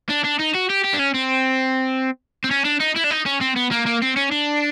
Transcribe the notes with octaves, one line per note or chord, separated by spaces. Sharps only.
D4
D4
D#4
F#4
G4
G4
D4
C#4
C4
C4
C#4
D4
D#4
E4
D4
D#4
C#4
C4
B3
A#3
A#3
C4
C#4
D4